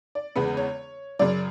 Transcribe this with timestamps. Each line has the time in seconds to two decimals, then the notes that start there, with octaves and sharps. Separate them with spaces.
0.15 D5
0.36 E2 C#3 G#3 B3 B4
0.57 C#5
1.19 F#2 C#3 F#3 D5